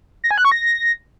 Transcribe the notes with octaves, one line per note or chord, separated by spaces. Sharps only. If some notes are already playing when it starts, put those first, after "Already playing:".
A#6
G#5
F#6
C#6
A#6